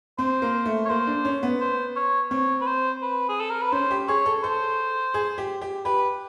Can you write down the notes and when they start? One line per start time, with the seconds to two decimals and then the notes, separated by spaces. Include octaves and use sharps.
0.18 C4 C5
0.42 A#3
0.66 A3
0.85 C#5
0.89 A#3 C5
1.07 D4
1.25 C#4
1.43 B3
1.60 C5
1.96 C#5
2.30 C4 C#5
2.61 B4
2.67 C5
3.02 B4
3.29 G#4
3.40 A4
3.50 A#4
3.62 B4
3.72 C#4 C5
3.91 G4
4.08 G#4 C#5
4.26 A4
4.43 A4 C5
5.14 G#4
5.38 G4
5.62 G4
5.85 G4 B4